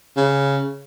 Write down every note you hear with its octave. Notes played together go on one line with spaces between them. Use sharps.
C#3